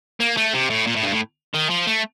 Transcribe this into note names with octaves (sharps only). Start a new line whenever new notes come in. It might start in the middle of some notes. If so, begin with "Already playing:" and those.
A#3
A3
C3
A2
A#2
A2
G2
A2
D#3
F3
A3